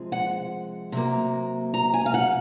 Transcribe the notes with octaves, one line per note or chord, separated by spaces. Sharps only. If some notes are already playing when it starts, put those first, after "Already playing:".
Already playing: C3 F3 G#3 C4
F#5
C3 F#3 A#3
A#5
G#5
F5
F#5